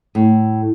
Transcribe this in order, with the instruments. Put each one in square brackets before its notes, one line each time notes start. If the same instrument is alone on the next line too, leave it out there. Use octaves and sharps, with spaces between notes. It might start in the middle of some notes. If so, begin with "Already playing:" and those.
[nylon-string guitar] A2